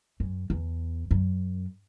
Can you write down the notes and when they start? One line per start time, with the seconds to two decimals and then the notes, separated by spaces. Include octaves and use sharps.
0.20 F#2
0.50 E2
1.11 F#2